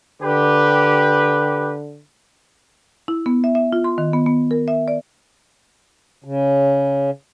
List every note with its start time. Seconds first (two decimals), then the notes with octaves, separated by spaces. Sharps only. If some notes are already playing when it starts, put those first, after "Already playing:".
0.22 D3 G4 B4
3.08 E4
3.26 B3
3.44 E5
3.55 E5
3.73 F4
3.84 C6
3.98 D#3
4.13 B3
4.26 B3
4.51 A#4
4.68 E5
4.88 D5
6.24 C#3